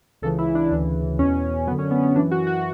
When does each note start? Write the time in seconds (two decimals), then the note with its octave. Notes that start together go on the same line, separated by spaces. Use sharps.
0.22 C#2 C#3 E3 A4
0.38 E4
0.55 D4
0.71 D2 C#3 E3
1.18 E2 B2 C#4
1.67 F#2 B3
1.71 D3
1.79 C#4
1.91 B3
2.03 C#4
2.16 F#2 E3 D4
2.31 F#4
2.47 F#4